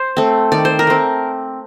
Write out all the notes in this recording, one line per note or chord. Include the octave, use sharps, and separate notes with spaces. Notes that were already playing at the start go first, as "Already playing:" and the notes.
Already playing: C5
A3 C4
D#3 D5
C5
A#4
A3 C4